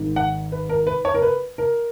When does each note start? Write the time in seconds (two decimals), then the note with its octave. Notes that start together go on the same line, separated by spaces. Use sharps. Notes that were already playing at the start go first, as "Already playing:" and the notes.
Already playing: G#1 G#2 D#3
0.16 F#5
0.52 B4
0.69 A#4
0.87 B4
1.05 C#5
1.14 A#4
1.22 B4
1.58 A#4